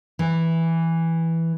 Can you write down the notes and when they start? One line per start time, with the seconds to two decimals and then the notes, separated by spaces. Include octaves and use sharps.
0.19 E3